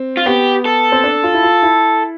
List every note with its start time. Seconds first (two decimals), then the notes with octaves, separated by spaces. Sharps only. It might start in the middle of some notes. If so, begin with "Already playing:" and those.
Already playing: C4
0.17 F4
0.26 B3 G4
0.65 A4
0.92 C4
1.04 D4
1.24 F4
1.34 E4
1.43 F4
1.63 E4